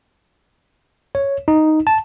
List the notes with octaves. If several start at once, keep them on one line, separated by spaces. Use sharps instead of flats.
C#5
D#4
A5